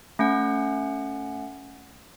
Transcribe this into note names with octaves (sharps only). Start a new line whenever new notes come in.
A3 C#4 F#5